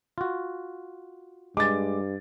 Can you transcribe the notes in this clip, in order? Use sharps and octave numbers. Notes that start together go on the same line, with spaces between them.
F4 F#4
G2 G#3 D6 A6